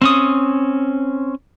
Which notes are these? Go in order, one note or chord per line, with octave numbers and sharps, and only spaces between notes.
C4 C#4 D#6